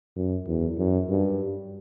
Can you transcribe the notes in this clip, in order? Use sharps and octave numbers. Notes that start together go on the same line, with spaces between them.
F#2
E2
F#2
G2